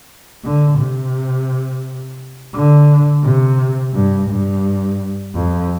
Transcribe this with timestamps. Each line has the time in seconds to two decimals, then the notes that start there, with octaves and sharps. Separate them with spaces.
0.44 D3
0.79 C3
2.54 D3
3.24 C3
3.94 G2
4.29 G2
5.35 F2